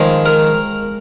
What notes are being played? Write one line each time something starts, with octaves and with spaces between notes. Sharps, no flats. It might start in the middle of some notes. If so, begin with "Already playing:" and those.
Already playing: D#3 F3 G#3
A#4